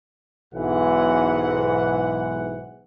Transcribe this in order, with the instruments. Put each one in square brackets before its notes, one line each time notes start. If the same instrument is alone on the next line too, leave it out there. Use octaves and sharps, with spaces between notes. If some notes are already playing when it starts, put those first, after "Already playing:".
[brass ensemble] B1 G#2 E3 F#5